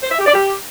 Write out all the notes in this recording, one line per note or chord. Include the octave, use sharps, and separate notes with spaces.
C5
E5
G4
D5
G4